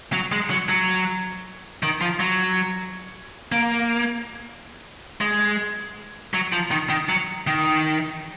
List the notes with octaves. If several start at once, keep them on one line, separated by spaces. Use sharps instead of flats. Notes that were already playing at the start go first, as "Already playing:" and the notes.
F#3
G#3
F#3
F#3
D#3
F3
F#3
A#3
G#3
F#3
F3
D#3
D#3
F#3
D#3